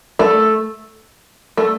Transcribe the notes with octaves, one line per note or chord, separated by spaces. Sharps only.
A3
A3